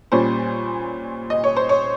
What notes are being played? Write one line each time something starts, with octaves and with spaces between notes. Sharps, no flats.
A#2 G3 C#4 C5
D#5
C#5
C5
C#5